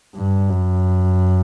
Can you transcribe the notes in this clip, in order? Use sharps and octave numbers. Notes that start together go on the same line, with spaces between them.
G2
F#2